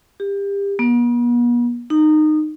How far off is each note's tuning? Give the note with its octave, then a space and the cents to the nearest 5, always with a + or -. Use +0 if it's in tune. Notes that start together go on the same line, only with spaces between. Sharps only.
G4 +30
B3 -45
D#4 -20